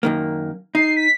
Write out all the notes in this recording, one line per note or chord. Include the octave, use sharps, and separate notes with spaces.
F#2 D#3 A#3
D#4 C7
B6